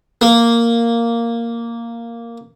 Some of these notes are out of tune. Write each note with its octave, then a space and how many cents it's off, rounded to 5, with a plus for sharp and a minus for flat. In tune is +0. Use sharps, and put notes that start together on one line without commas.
A#3 -5